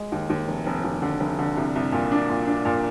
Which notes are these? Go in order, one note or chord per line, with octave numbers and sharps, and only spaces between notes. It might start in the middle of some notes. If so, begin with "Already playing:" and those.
Already playing: G#3
D#2
D#2
F1
F1
D#2
D3
F1
D3
C2
C2
A#2
D4
A#2
D4
A#2